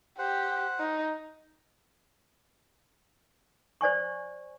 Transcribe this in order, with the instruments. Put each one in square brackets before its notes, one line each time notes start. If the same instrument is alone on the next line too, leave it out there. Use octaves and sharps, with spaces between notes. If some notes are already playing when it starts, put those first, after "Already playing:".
[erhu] G4 [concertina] C5 F#5
[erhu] D#4
[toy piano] C5 D5 G#5 C#6